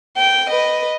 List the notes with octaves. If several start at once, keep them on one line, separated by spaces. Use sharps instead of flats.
G5
B4 D#5